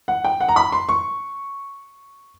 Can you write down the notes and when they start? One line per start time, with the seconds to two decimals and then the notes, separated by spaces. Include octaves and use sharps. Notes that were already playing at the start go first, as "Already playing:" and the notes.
0.08 F#5
0.24 G5
0.41 F#5
0.48 A#5
0.56 B5
0.72 C6
0.89 C#6